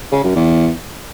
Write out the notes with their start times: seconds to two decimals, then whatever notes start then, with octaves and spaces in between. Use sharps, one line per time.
0.12 C#3
0.24 F#2
0.35 E2